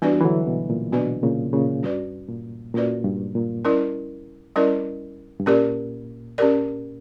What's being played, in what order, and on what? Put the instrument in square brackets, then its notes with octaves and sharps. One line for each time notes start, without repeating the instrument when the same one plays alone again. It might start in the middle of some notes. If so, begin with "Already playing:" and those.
[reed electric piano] E3 G3 [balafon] B3 D4 F#4 B4 D5
[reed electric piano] E3
D3 F#3
B2
A#2
[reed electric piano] B2 [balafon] B3 D4 F#4 B4 D5
[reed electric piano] A#2 C#3
A#2 C#3
[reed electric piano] G2 [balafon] C#4 F#4 B4 D5
[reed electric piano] A#2
[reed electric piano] A#2 [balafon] C#4 F#4 B4 D5
[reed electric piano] G2
A#2
[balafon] G3 C#4 E4 A#4 D5
G3 C#4 E4 A#4 D5
[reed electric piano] G2
[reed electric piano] A#2 [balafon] C#4 G4 A#4 D5
[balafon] C#4 G4 A#4 D5